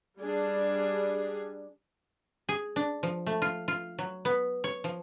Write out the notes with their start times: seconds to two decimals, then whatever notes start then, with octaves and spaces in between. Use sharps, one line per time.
0.20 G3 D4 G#4
2.49 G#4
2.76 D4
3.03 F3
3.26 A3
3.42 F4
3.68 F4
3.99 F#3
4.25 B3
4.64 C#5
4.84 F3